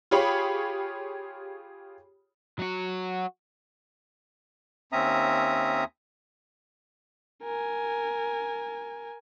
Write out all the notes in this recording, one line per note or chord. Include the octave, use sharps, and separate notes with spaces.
F4 G4 G#4 C#5 B5
F#3 F#4
D#2 C4 C#4 E5 A#5 D#6
A#4 G#5